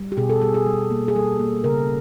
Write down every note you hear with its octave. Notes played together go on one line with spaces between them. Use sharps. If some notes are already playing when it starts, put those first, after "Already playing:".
Already playing: G3
G4
B2 G#4
A4
G3 G#4
G#4
G3
A#3
G#4
G3 A4
A#3
C#3 A#4